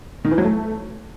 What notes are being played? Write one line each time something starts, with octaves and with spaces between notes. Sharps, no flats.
D#3
E3
F#3
A3